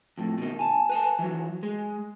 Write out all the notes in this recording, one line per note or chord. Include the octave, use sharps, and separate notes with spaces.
F2 A2
B2 D#3
G#5 A5
B4 G#5 A5
E3 F#3
G#3